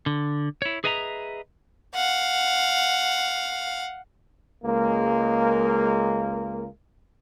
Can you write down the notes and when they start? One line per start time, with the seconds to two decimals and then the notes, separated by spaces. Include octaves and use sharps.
0.06 D3
0.62 E4 C#5
0.84 G#4 B4 D#5 E5 A5 A#5
1.95 F5 F#5
4.64 C#2 G#3 A#3